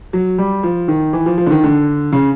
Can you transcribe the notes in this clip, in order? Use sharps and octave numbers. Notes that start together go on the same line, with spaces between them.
F#3
G3
F3
D#3
E3
F3
F3
D3
D#3
D3
C#3